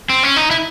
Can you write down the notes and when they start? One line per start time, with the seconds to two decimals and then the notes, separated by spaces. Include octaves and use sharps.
0.10 C4
0.23 C#4
0.36 D#4
0.50 E4